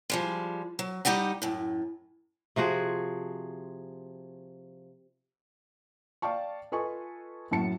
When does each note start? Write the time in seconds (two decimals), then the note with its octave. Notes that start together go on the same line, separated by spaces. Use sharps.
0.10 F3 G3 G#3
0.79 F#3
1.05 G3 D#4 G4 D#5 F#5
1.42 F#2 A2
2.56 C3 F3 F#4 G#4
6.22 D5 F5 G5 A5 C#6
6.72 F4 A4 B4 D#5 G#5 C#6
7.51 F#2 A2 F#3 A5 C#7